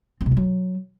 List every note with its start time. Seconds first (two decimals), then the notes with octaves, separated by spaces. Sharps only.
0.21 C4
0.26 C3
0.31 F3
0.37 F#3